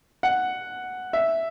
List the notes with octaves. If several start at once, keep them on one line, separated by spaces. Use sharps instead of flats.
F#5
E5